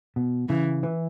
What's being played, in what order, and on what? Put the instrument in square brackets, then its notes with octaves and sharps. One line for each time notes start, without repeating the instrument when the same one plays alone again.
[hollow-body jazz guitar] B2
[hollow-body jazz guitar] C#3 [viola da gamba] E3
[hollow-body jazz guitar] E3